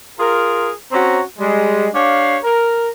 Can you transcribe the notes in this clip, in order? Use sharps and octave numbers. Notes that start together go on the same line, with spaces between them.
F4 G#4 A#4
C4 C#4 F#4 C#5 A#5
G3 G#3
D4 G4 C#5 F5
A#4